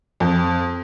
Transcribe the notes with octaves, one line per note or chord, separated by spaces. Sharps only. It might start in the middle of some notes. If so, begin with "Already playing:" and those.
F2